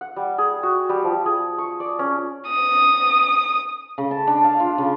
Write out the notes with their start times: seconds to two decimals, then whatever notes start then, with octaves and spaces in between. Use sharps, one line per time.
0.01 F#5
0.16 G3
0.38 G#4
0.63 F#4
0.89 G3
1.04 F3
1.26 G#4
1.58 C#6
1.80 D5
1.99 C#4
2.48 D#6
3.98 C#3
4.11 A5
4.27 D4
4.44 F5
4.60 F4
4.78 C#3